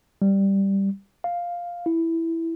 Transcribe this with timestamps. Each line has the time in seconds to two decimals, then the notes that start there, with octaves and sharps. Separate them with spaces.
0.22 G3
1.24 F5
1.86 E4